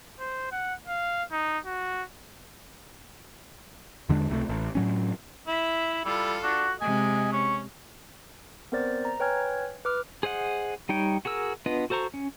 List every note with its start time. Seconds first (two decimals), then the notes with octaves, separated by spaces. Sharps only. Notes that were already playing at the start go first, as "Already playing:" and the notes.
0.19 C5
0.52 F#5
0.87 F5
1.32 D#4
1.66 F#4
4.09 E2 D3 G#3 D4
4.30 C#2 C3 E3 A3
4.49 A1
4.75 A2 F#3 C#4
5.47 E4 E5
6.05 G3 E4 F4 A4
6.44 D4 F#4
6.81 C3 G#3 D#5 G#5
7.33 C#4 C#6
8.72 B3 C4 A#4 C5 D5 A6
9.05 A#5
9.20 B4 C#5 G5 G#5 F6 G#6
9.85 B4 D6 F6
10.23 G#4 C5 D#5 F#5
10.89 G3 D#4 C#5 G5
11.25 F#4 G#4 A#4 E6
11.66 B3 D4 F4 B4 D#5
11.90 F#4 A4 C5 A#5 C#6
12.14 C#4